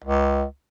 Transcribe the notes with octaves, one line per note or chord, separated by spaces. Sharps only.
C#2